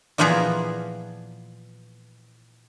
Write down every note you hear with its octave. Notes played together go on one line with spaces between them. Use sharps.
A#2 E3 F3 B3 G#4 A#5